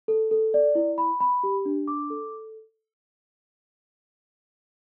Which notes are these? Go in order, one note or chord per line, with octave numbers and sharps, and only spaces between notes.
A4
A4
D5
E4
B5
B5
G4
D4
D6
A4